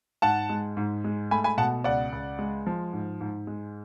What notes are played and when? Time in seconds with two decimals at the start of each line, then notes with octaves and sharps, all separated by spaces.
0.22 G#2 F#5 A5
0.49 G#3
0.77 G#2
1.04 G#3
1.31 A3 G#5 B5
1.44 G#5 B5
1.57 B2 F#5 A5
1.84 C#2 D5 F#5
2.12 C#2
2.39 G#3
2.66 F3
2.93 G#2
3.21 G#2
3.47 G#3